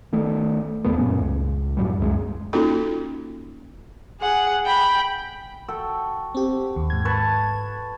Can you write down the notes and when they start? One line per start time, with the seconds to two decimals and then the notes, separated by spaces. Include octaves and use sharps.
0.13 D#3 A3
0.84 E2 C3 A3 B3
0.98 F#2 A#2 C#4
1.21 C#2
1.77 F#2 A2 F#3 G3
1.99 C#2 F#2 F#3 G#3
2.53 A#3 C#4 D#4 F4 F#4 A4
4.21 G#4 F#5
4.65 G5 B5
5.68 F#4 A4 G5
6.35 C4 G4
6.76 D#2
6.90 G#2 G#6
7.05 B4 A5 C#6